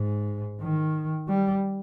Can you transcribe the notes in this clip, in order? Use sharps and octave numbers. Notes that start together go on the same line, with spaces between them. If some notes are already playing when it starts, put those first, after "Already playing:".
Already playing: G#2
D#3
G3